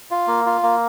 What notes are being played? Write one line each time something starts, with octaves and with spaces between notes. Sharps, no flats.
F4
A#3
F4
A#3